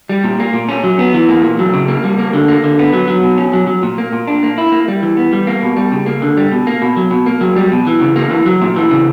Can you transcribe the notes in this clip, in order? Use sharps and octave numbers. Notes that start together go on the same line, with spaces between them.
G3
A#2
A#3
A#2
C#4
F#3
B3
E3
A#3
A#2
F#3
C#3
A#3
G3
A#3
D3
A#3
D3
B3
F#3
F#3
B2
C#4
F#3
F#3
A#2
A#3
A#2
D4
A#3
E4
A#3
G3
E3
B3
G3
A#3
B2
G3
C#3
A#3
D3
G3
B2
A#3
B2
F#3
B2
A#3
F#3
G3
B2
E3
C#3
A#3
E3
F#3
A#2
E3
C#3